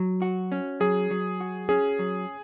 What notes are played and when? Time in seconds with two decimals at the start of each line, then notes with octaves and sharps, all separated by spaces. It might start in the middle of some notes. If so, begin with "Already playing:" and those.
Already playing: F#3
0.22 F#4
0.52 C#4
0.80 F#3 G#4
1.11 F#3
1.40 F#4
1.69 C#4 G#4
1.99 F#3